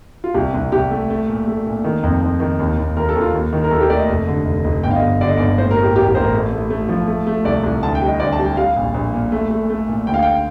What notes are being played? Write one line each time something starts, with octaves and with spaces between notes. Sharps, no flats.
F4
C2 G4
C2
C2 G4
A3
A3
A#2
A3
A#2
D#3
F2
F2
D#3
D#2
D#2
D#2 A#4
A4
D#2
F4
D#2
D#3
A#4
D#2 A4
G4
A3 D5
D#5
F1
D3
F1
F1
G1 G5
F5
D#5
G1
D3 D5
D#5
G1 D5
A2 C5
A#4
A2
G4
A1 G4
G4
A1 C5
A#4
A3
A3
A3
F3
A3
A3
C2 D5
C2
D2 A5
G5
G3
D#5
D2 D5
A5
G3
G5
G3 F5
A#1
A#1
A#2
A3
A3
A3
A#2
D2 G5
F5
G5